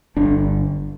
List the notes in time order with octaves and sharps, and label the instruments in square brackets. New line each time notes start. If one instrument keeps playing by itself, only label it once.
[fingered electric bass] G1 G2 D3 D4